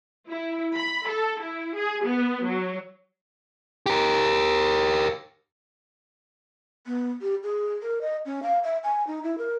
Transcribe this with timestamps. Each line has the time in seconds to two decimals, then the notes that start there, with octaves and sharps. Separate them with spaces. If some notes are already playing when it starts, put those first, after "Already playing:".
0.28 E4
0.75 B5
1.08 A4
1.41 E4
1.75 G#4
2.04 B3
2.44 F#3
3.86 G4 A#4
6.86 B3
7.22 G4
7.43 G#4
7.82 A#4
8.01 D#5
8.25 C#4
8.43 F5
8.64 E5
8.83 G#5
9.07 D#4
9.23 E4
9.38 A#4